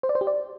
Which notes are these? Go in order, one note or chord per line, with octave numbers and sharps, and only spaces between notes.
C5
D5
C5
G4
D5